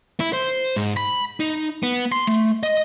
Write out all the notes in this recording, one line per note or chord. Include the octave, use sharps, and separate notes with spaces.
E4
C5
G#2
B5
D#4
B3
C6
A3
D#5